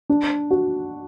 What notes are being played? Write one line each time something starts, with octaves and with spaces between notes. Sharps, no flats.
D4
F#4